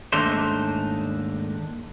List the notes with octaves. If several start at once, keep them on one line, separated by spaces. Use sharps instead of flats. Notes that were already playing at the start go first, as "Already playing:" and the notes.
D#2 G#2 A3 D4 D#4 C5